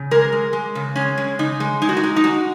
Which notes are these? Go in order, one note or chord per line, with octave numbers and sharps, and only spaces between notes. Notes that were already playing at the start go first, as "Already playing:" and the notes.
Already playing: C#3
G#3 A#4
G#3
G#3
C#3
G#3 C#4
G#3
C#3 D#4
G#3
G#3 D#4
F#4
D#4
G#3
D#4
G#3 F#4